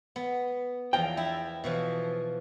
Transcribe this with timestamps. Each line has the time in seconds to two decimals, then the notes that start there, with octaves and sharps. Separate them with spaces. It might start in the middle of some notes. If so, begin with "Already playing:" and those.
0.16 B3
0.93 E2 F3 G5 A#5
1.17 E4 E5
1.64 B2 E3 F3